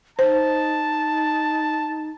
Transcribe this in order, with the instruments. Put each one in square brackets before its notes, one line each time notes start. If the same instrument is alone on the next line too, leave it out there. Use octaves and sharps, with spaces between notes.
[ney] D#4 [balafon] C5 [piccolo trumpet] A5